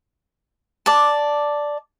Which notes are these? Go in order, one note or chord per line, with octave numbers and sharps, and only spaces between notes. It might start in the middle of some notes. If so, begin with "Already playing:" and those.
D5 A5